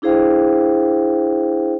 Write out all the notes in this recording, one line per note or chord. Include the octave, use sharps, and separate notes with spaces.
D4 E4 G#4 C5 F5 G5